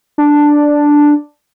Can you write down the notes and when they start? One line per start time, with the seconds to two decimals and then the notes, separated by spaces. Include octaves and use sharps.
0.18 D4